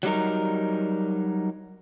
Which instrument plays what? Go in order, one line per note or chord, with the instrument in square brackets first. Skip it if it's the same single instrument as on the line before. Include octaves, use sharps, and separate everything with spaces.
[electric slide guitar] F#3 G3 D#4 A#4